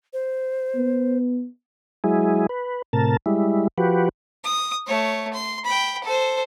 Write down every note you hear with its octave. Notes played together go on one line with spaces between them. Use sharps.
C5
B3
F#3 G#3 E4 G#4
B4
A2 C3 A#4 A5
G3 G#3 E4
F3 F#4 G4 B4
D#6
A3 C#5
C6
G5 B5
A4 C5